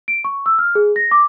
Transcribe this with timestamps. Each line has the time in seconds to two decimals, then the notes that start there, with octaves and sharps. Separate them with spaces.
0.08 D7
0.24 C#6
0.46 E6
0.59 F6
0.75 G#4
0.96 A#6
1.11 D6